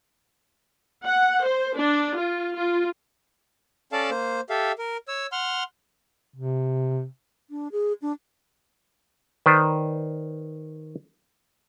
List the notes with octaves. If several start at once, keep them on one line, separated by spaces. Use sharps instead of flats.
F#5
C5
D4
F4
F4
C#4 A4 D5 F5 A5
A#3 C5
G4 A4 E5 F5
A#4
C#5 E6
F#5 C6 F6
C3
D4
G#4
D4
D#3 B4 C5 D5